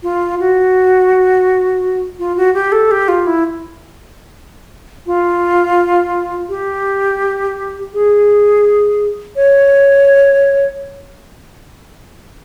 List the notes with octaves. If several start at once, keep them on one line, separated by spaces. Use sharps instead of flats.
F4
F#4
F4
F#4
G4
A4
G4
F4
E4
F4
G4
G#4
C#5